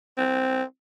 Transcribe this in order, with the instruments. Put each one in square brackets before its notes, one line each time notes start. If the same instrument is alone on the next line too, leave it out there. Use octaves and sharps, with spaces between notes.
[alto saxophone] C4